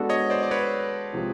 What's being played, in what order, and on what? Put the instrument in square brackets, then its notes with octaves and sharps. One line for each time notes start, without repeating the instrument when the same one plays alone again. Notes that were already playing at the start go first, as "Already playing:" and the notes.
Already playing: [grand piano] G#3 B3 D4 F#4 A4
[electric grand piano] C#5 D#5
C5 D5
D5
B4 C#5
[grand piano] C3 F3 G#3 C4 F4